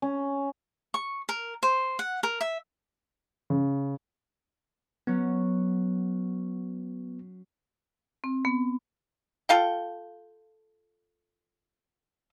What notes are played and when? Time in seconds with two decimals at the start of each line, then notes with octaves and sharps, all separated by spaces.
0.02 C#4
0.94 C#6
1.29 A#4
1.63 C5
1.99 F#5
2.23 A#4
2.41 E5
3.50 C#3
5.07 F#3 B3 C#4 F#4
8.24 C4
8.45 B3
9.49 F4 A4 F5 G5